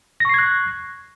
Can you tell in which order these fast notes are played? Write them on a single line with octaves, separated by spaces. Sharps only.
A#6 C#6 C7 G#6 F#6